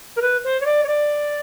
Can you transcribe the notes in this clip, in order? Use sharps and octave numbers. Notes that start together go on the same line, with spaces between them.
A#4
B4
C5
C#5
D5
C#5
D5